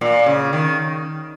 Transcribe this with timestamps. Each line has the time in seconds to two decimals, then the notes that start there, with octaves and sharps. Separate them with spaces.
0.01 A#2
0.26 C#3
0.53 D#3